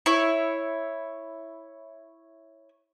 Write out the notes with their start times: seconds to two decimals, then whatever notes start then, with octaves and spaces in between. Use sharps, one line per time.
0.06 E4 C#5